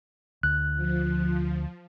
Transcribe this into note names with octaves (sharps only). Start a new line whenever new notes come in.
D2 F#6
F3